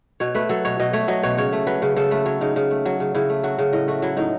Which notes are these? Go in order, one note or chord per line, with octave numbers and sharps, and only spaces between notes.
B2 C#5
A3 B4
F#3 A4
B2 C#5
B2 D#5
A3 C#5
F#3 D#5
B2 C#5
C#3 C#5
A3
F#3 B4
C#3
C#3 A4
A3 B4
F#3 C#5
C#3 D#4
C#3
A3
F#3
C#3
C#3 E4
A3
F#3 F#4
C#3
A2 D#5
A3 F#4
F#3 E4
A2 D#4